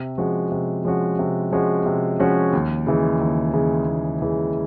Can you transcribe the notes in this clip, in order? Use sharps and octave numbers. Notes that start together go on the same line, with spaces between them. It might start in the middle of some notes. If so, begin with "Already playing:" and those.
Already playing: C3
F3 G#3 C#4 F#4
C3
F3 G#3 C#4 F#4
C3
F3 G#3 C#4 F#4
C3
F3 G#3 C#4 F#4
D#2
C#3 E3 G#3
D#2
C#3 E3 G#3
D#2
C#3 E3 G#3